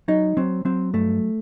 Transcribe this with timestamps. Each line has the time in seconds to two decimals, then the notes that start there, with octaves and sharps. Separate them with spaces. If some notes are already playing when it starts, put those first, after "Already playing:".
0.08 F#3 D#4
0.37 F#3 C4
0.65 F#3 C4
0.93 G2 A3